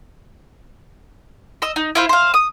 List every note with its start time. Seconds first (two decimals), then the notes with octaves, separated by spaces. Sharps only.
1.62 D#5 E6
1.76 D#4
1.95 E4 F4 C5
2.09 C5 F5
2.34 D#6